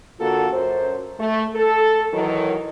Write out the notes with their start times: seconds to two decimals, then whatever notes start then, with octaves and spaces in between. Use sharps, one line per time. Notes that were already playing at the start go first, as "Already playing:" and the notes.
0.20 D3 A#3 F4 F#4 A4
0.51 F#2 C5
1.19 A3
1.55 A4
2.14 D#3 E3 F#3